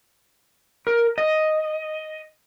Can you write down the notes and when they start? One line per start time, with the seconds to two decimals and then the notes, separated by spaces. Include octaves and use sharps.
0.87 A#4
1.18 D#5